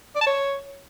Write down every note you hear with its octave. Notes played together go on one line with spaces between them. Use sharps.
D5
A5
C#5